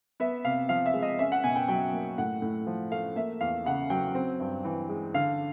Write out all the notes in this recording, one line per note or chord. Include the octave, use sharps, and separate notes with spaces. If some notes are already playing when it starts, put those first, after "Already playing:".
B3 E5
C3 F5
F3 F5
E5
G#3
D#5
C#4 E5
F#5
B2 G#5
G5
F#3 G5
A#3
A2 F#5
A2
F3
A3 F5
A#3 E5
E2 F5
C#3 F#5
F#3 G5
C4
G2
E3
G#3
D3 F5